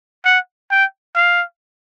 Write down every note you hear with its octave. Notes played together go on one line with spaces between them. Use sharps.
F#5
G5
F5